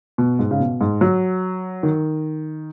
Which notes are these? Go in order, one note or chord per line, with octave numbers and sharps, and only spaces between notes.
B2
G#2
C#3
B2
G#2
F#3
D#3